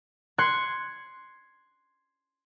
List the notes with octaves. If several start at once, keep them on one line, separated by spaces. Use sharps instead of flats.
C6 F#6 G#6 C#7